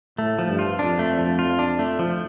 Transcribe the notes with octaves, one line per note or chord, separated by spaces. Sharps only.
A2 A3
F3
G2
F4
F2 D4
A3
F3
F4
D4
A3
F3